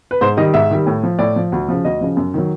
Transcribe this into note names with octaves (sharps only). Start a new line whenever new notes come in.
B4
G#2 C5
D#3 G3 D#5
G#2 E5
D#3 G3
A2
F3
A2 D5
F3
D2
C#3 F3
D2 D#5
C#3 F3
F#2
D#3 F#3